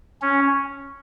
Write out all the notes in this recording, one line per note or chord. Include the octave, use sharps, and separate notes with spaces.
C#4